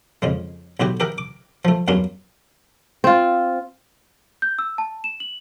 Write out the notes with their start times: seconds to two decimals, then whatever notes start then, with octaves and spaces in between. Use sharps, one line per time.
0.22 F2 C#3 G#3
0.80 B1 A2 F#4 G4
1.00 G4 A#4 E5 F#5
1.18 D6
1.65 F3 A3
1.88 E2 G2 F#3 A#3 C#4 C6
3.04 C4 F4
4.42 G6
4.59 E6
4.78 A5
5.04 E7
5.20 F#7